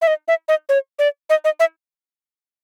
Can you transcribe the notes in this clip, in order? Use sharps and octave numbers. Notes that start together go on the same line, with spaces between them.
E5
D#5
E5
D#5
C#5
D5
D#5
D#5
E5